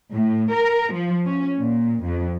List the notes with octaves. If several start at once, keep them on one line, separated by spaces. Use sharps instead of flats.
A2
A#4
F3
C#4
A#2
F2